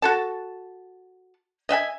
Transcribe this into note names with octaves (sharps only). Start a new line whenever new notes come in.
F#4 A4 A5
D#5 E5 F#5 G#5